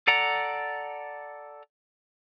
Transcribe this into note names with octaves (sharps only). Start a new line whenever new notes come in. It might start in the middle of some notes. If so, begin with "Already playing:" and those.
A4 D5 F#5 A#5